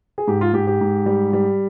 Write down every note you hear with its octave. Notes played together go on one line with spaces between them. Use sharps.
G#4
G#2 G4
F4
G#2 G4
G4
G#2
G3
G3